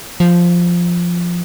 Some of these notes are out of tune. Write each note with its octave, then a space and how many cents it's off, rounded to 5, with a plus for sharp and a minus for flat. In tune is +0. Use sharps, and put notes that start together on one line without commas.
F3 +0